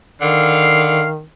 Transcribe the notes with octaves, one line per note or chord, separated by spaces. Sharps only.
D3 D#3 F5